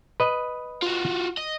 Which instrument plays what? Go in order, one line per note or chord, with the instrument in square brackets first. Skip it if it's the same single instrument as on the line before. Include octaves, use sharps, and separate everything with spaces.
[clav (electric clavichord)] B4 D#5
[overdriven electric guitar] F4 F#4
D#5